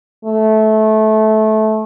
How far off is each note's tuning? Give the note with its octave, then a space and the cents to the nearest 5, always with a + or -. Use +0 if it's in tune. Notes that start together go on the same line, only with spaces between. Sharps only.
A3 -20